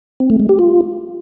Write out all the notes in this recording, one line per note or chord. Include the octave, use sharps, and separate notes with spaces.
C4
A3
G#3
G4
F4